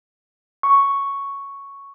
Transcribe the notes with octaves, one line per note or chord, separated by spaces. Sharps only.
C#6